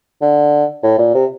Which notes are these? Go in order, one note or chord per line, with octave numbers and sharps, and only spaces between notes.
D3
A2
A#2
C3